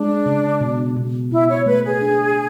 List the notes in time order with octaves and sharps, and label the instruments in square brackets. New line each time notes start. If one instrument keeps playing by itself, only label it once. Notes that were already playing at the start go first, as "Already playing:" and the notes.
Already playing: [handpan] G#3 [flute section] D4
[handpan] C#3
B2
B2
[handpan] B2 [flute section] E4
[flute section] C#5
[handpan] A3 [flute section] B4
[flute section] G#4
[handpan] D4